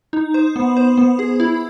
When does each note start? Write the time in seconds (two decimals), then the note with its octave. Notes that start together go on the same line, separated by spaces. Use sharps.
0.13 D#4
0.34 C5
0.56 B3
0.77 C5
0.97 B3
1.19 G#4
1.40 E4